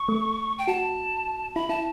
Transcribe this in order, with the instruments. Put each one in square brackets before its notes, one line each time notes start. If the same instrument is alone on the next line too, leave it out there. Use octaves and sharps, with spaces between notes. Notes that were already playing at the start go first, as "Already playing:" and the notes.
Already playing: [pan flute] C#6
[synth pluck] A3
[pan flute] G5
[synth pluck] F#4 [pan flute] A5
[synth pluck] E4 [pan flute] B5
[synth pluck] E4 [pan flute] A5